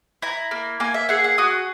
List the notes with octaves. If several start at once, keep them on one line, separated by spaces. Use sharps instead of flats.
E4 A#5
A#3
A#3 G#5
E5
G#4 F#5
F#5
F#4 D#6